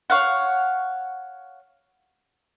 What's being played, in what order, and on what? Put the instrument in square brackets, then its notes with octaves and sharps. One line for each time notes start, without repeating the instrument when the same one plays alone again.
[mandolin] C#5 F5 F#5